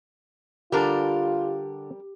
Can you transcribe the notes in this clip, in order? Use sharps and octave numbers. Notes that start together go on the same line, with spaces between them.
D3 G3 D4 F4 G4 A#4 A5